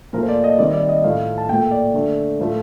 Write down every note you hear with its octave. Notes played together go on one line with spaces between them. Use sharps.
A#2 F3 A3 A#4
C5
D5
D#5
C3 D#3 G3 D5
D5
D#5
A2 F3 A3 F5
A5
A#2 A3 G5
D5
D3 A3
A2 F3 A3